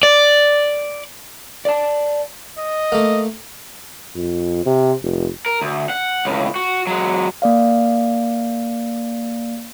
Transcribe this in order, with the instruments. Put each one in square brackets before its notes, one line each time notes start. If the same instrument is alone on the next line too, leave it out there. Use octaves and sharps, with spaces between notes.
[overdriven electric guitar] D5
[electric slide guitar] D5 A5
[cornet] D#5
[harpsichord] A3 A#3
[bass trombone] F2
C3
F1
[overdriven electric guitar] A#4
D2
F#5
C#2 A2
F#4
F#3 G#3
[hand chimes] A#3 D5 F5